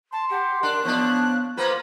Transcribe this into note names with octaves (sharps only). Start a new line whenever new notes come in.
A5 C6
G4 F#5
D4 A#4 F#6
F3 B3 D4 C#5
A#3 B3 F4 B4 C5